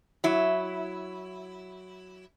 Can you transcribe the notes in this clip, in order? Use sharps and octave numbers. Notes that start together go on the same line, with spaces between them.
F#3 E4